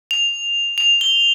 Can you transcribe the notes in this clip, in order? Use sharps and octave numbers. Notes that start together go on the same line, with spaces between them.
F7
F7
G7